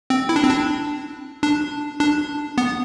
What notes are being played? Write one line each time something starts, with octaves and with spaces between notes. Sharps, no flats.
C4
E4
D4
C4
D4
D4
D4
B3